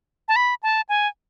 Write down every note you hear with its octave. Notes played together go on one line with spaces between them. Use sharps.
A5
B5
A5
G#5